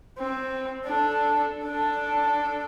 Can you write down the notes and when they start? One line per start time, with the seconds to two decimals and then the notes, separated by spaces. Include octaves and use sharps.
0.18 C4
0.85 D4 A4
1.65 D4 A4